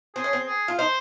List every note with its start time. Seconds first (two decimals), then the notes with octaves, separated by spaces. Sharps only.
0.16 C4 G#4
0.24 C#4
0.33 C4
0.47 G#4
0.68 F4
0.78 D#4 C5